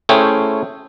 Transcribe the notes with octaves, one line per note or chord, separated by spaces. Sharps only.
A3 C#4 E4 G#4 C5 G5